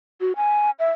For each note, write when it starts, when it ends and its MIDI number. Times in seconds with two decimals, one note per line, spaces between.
0.21 0.32 66
0.36 0.70 80
0.79 0.89 76